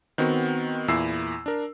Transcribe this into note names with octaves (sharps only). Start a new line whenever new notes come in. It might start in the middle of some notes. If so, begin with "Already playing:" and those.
D#3 B3 C4 F#4
E2 A#2 E4 E6 C7
D4 A#4